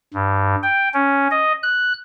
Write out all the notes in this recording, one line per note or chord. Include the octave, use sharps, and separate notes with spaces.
G2
G5
C#4
D#5
F#6